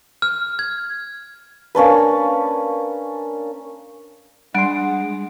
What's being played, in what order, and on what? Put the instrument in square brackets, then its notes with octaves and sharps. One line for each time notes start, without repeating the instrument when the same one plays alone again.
[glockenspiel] F6
G#6
[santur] A#3 C#4 D4 B4
[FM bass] G3 [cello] G#3 [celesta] D4 D7 [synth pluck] F#5 C6